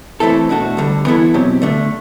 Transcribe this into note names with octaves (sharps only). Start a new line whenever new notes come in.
E3 A3 C4 E4 A4
B2 A3 D4 F#4 A4
D2 D3 G3
E3 B3 E4 A4
B2 F#3 C4 G4
D3 A3 D4